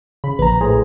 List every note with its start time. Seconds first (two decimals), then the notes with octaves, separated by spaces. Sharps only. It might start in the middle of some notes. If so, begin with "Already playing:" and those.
0.24 C#3 B5
0.39 A#1 B4 A#5
0.61 A2 G#4 C5